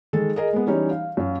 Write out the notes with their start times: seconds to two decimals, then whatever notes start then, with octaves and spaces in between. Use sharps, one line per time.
0.13 D#3 G#3 G#4 A4
0.36 G#4 A#4 D#5
0.53 G#3 B3
0.67 E3 G3 C#4 D#4 C#5
0.91 F5
1.17 F#2 F5